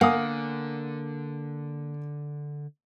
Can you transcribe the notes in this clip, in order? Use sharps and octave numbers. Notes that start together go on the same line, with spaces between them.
D3 A#3 F#5 G#5 D#6